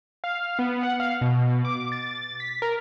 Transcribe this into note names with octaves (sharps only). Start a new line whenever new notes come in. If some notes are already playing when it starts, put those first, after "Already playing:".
F5
B3
F#5
F5
B2
D6
A6
B6
A#4